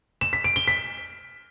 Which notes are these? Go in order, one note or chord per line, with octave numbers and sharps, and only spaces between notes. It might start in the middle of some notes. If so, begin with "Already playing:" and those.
E7
B6
D7
G7
B6